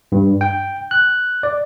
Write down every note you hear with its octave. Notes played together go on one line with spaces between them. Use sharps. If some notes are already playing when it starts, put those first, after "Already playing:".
G2
G5
F#6
D5